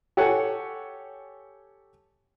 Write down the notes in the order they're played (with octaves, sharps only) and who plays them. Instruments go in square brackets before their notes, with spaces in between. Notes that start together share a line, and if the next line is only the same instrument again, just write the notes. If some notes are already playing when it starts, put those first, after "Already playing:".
[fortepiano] G4 A4 C#5 F#5 G#5